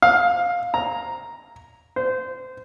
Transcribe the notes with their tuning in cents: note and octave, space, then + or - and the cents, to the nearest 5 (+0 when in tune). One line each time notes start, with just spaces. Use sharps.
F5 +15
A#5 +0
C5 -25